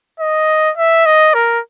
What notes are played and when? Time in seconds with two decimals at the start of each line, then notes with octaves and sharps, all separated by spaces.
0.20 D#5
0.77 E5
1.06 D#5
1.34 A#4